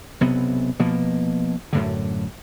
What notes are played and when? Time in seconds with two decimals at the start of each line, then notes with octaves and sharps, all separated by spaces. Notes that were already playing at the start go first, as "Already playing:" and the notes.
0.21 B1 C3 B3
0.79 B2 F3 A#3
1.73 F#2 A2 D3